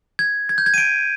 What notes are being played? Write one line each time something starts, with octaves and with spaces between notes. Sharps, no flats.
G#6
G#6
G6
G#6
D#7
D7